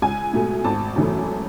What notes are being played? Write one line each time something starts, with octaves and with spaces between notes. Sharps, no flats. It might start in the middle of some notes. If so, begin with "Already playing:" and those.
C#2 G#5
B2 A3
G#1 A5
F#2 E3 A3